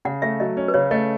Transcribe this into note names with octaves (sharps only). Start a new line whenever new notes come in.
C#3 F#5
A3 E5
F#3 D#5
C#4
B4
C#3 C#5
A3 D#5